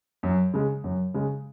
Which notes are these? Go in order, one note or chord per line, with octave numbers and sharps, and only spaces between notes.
F#2
C#3 G#3
F#2
C#3 G#3